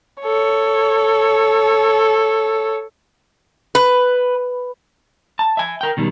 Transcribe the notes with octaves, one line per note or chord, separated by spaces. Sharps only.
A4 C#5
B4
A5
E5 G#5
A#4 G5
B2 D#3 G3